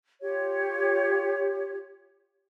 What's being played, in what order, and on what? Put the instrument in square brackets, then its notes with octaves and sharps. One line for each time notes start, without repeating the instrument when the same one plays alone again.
[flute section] F4 G4 C#5